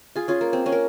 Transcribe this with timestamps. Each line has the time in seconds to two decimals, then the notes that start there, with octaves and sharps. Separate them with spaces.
0.16 F4 G#4
0.28 C#4 F4
0.41 A#3
0.53 C4
0.66 A#3 C#4
0.72 A#4